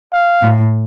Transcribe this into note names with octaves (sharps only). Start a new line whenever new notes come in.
F5
A2